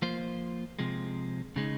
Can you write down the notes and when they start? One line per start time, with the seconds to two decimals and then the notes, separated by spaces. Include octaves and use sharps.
0.02 F3 A#3 F4 C5
0.79 C3 F3 G#3
1.56 C#3 G#3 D#4